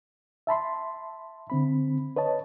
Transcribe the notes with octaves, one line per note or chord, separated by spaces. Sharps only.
E5 A5 B5 C6
D3 C4 B5
B4 C#5 D#5 A5